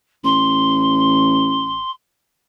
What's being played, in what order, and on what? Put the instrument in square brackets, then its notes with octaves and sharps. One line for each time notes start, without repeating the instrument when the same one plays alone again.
[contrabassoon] A1 [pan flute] C6